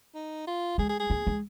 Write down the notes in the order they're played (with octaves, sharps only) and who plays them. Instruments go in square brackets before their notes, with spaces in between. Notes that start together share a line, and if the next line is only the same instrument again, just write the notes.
[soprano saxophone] D#4
F4
[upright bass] G#3 [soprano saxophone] G#4
[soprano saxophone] G#4
G#4
[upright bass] A#3
G#3